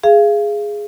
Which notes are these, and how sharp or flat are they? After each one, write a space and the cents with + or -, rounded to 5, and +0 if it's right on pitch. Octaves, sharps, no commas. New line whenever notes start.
G#4 +0 F5 -30